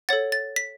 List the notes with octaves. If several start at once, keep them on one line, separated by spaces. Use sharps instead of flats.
A4 C#5 F#5 A6
A6
B6